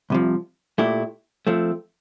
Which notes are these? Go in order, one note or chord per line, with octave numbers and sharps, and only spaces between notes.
C2 C3 F3
A#2 A3 E4 G4
F3 A3 C4